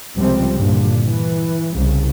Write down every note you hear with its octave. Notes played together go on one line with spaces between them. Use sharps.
C#2 C3 F3 G3 C4
G2 A#2 D3
E3
C2 C#3